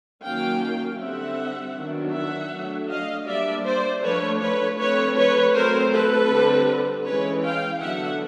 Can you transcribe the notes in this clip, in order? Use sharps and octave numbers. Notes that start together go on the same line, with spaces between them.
D#3 F#3 A#3 C#4 F5 G5
D3 G3 C4 E5 F#5
D#3 F#3 B3 D4
E5 F#5
F#3 A3 D4
D#5 F5
G3 A#3 D4 D5 E5
C5 D5
F3 A3 D4 B4 C#5
B4 C#5
F3 A3 C4 B4 C#5
B4 C#5
F#3 A3 C4 A#4 C5
A4 B4
D3 G3 C4
E3 G#3 C#4 B4 C#5
F5 G5
D3 F#3 B3 D4 E5 F#5